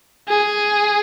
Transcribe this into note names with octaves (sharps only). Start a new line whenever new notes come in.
G#4